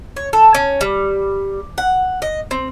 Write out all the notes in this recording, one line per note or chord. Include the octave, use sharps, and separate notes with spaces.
C#5
A4
C#4
G3
F#5
D#5
C4